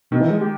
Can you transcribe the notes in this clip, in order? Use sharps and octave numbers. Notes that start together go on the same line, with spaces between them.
B2 D#3
E3
G#3
G4